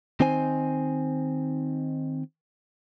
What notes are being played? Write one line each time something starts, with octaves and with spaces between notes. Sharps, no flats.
D#3 C4 D#4 C5 G#5